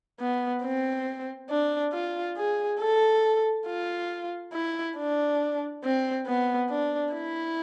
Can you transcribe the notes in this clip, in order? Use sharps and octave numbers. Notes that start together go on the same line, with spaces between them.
B3
C4
D4
F4
G#4
A4
F4
E4
D4
C4
B3
D4
E4